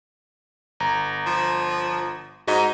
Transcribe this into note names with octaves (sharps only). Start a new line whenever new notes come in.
G1 A#5
F3
G#2 F#4 D#5 A#5